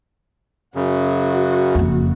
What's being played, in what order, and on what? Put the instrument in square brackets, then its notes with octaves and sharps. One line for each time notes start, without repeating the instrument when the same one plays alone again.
[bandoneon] F#2 C#3 [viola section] F#4
[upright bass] F#1 F2